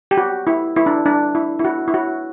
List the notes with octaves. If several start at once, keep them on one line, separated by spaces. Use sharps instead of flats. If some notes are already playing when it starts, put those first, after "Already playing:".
G4
F#4
E4
E4
D4
D4
E4
E4
F#4
E4
F#4